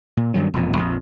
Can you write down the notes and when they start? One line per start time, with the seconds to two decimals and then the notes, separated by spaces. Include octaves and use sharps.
0.17 A#2
0.34 G2 D#3 F#3
0.54 E1 F2 A#2
0.77 A#1 F2